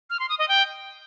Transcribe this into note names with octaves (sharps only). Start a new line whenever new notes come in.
F6
C6
D#6
D#5
G5